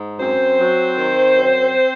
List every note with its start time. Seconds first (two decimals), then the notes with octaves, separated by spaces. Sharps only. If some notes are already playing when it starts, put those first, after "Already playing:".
Already playing: G#2
0.20 F#2 C4 C5
0.58 F#3
0.97 D#3
1.36 F#2